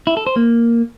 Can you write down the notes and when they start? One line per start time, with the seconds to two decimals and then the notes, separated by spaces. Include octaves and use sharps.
0.07 E4
0.17 A4
0.27 C5
0.36 A#3